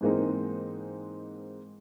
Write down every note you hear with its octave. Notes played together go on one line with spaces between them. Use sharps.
G#2 E3 G#3 A#3 C4 D#4